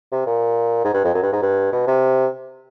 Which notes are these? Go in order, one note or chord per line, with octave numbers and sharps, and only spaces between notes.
C3
A#2
G#2
G2
F2
F#2
G2
G#2
G2
B2
C3